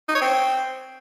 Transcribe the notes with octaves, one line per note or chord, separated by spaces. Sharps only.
D#4
C#5
C4